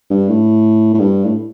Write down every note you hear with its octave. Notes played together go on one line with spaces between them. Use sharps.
G2
A2
A2
G2
A2